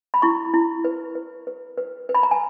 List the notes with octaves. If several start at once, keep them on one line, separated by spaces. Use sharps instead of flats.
B5
E4 C#6
E4
B4
B4
B4
B4
B4
B5
A#5
G#5